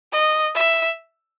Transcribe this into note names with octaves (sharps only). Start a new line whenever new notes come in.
D#5
E5